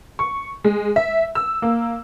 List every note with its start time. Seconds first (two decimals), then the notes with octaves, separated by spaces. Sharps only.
0.19 C#6
0.64 G#3
0.96 E5
1.35 E6
1.62 A#3